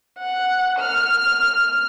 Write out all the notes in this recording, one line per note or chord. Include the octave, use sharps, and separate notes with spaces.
F#5
F6